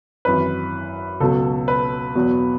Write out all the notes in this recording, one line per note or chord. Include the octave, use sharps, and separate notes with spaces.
G#1 F#2 E3 B4
C#2 B2 F#3 A4
B4
E2 B2 F#3